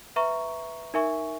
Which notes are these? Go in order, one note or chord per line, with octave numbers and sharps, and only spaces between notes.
B4 E5 A#5 C#6
D#4 A#4 E5 G#5 C#6